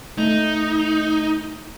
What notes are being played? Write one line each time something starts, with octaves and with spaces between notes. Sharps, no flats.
A3 D#4